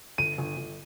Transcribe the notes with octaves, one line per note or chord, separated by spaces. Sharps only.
G1 D#7
G1
G1